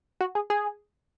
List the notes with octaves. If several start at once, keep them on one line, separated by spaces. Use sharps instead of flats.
F#4
G#4
G#4